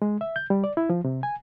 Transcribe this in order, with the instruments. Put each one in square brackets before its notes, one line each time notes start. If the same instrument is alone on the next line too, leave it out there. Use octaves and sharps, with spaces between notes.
[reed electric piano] G#3
E5
G6
G3
D5
E4
F3
C3
G#5